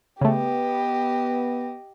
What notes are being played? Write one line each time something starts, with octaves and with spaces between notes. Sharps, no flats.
C#3 A3 B3 G4 D#5